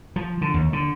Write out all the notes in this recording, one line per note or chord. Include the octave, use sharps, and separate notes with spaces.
F3
D3
D#2
D3